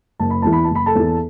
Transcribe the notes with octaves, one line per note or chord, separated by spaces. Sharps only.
F#1 A5
B5
E2 E3 A5
B5
A5
F#1
B5
A4 A5
E2 E3